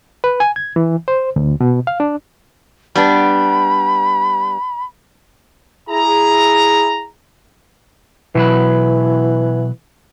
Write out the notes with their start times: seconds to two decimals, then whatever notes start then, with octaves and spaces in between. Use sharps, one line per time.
0.24 B4
0.40 G#5
0.56 G#6
0.76 E3
1.08 C5
1.36 D2
1.60 B2
1.87 F5
2.00 D4
2.95 G3 B3 D4 B5
5.90 E4 G#4 A#5
8.35 B2 E3 F#3 B4